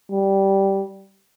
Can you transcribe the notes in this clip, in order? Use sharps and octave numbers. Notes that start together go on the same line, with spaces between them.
G3